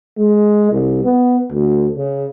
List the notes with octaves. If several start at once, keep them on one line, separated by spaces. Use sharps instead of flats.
G#3
C2
B3
D2
C#3